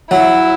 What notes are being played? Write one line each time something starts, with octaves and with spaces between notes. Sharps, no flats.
F#3 E4